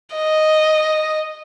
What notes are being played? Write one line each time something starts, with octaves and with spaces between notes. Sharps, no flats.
D#5